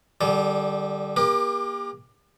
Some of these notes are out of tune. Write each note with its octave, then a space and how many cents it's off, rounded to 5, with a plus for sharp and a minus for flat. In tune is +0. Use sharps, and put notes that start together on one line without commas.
D3 +25 G3 -10 A4 -45
A#3 +30 G4 +35 A#4 +30